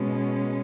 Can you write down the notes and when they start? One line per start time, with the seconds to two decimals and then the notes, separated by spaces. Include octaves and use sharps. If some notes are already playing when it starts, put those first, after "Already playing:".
Already playing: B2 G#3 C#4